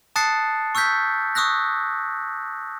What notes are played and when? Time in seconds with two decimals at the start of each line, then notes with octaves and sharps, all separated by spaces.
0.16 A5 D#6 F#6 A6 C7 C#7
0.75 C#6 E6 F#6 G6 B6
1.35 C#6 D#6 E6 F#6 A#6